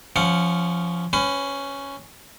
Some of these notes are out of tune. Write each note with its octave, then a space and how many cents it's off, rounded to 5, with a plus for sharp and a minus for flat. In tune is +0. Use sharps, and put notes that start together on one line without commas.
F3 -10 C#4 +10 F#5 +0
C#4 +0 B4 +30